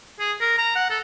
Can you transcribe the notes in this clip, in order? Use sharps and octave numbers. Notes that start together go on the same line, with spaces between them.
G#4
A#4
A#5
F#5
A4